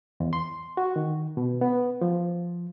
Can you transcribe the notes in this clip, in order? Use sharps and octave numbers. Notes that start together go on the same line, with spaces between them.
E2
C6
F#4
D#3
B2
B3
F3